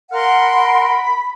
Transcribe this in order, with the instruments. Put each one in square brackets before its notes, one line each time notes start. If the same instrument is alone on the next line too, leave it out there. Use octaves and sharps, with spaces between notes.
[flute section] A#4 F#5 C6 [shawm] F5
[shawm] B5